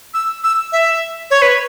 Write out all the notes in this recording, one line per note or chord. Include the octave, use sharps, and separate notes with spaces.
E6
E6
E5
C#5
B4